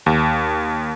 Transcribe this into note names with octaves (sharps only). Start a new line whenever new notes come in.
D#2